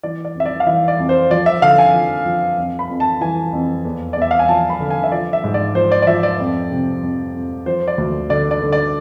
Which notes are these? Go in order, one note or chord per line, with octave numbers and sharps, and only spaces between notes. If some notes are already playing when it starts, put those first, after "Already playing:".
E3 D5
D5
F2
E5
D5
F5
E3 E5
D5
F2
C5
F3 D5
E5
D3 F5
G#5
F3
F3
F2
B5
F2
A5
E3 G#5
F2
E2
E2 D5
E5
F5
G#5
F3 A5
B5
D3
G#5
E5
F3 D5
E5
G#2
D5
F3 C5
D5
D5
F3 E5
D5
F2
C3
F2
F2
F3 C5
D5
D2
D3 D5
D5
D3
D5